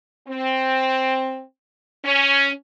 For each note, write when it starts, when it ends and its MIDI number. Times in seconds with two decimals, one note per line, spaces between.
0.27 1.41 60
2.04 2.48 61